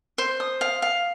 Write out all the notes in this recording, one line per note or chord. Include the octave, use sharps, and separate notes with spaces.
C5
D#6
F5
F5